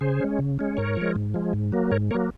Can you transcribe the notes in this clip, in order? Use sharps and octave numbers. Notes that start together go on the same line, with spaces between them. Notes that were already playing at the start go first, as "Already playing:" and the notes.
C#3 G#4 C5
G#3 C#4
C#3
G#3 C#4
G#2 A#4 C#5
F3 G#3
G#2
F3 G#3
G#2
F#3 A#3
G#2 A#4 C#5
F#3 A#3 A#4 C#5